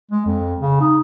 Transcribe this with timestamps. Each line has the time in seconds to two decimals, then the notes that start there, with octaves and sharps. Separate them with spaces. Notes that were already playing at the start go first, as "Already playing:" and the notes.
0.11 G#3
0.26 F2
0.60 C#3
0.80 D#4